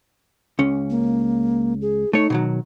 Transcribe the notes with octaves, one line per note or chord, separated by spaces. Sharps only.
C#2 C#4
A#3
G#4
A3 D#4 C#5
B2 D#3 F#3